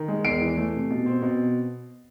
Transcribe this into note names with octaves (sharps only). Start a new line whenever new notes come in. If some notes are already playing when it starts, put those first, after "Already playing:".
Already playing: D#3
G#3
E2 C7 D7
E3
A3
C3
B2
C4
B2